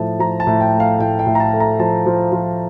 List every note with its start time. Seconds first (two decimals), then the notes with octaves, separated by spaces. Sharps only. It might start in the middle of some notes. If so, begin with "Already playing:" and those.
Already playing: A2 F3 A3 A5
0.19 F3 A#5
0.40 A5
0.47 A2
0.61 G5
0.74 A3
0.80 F5
0.99 A2 G5
1.19 G5
1.26 A2
1.35 A#5
1.40 A5
1.54 A3
1.60 A#5
1.79 F3 A5
2.06 F3
2.32 F3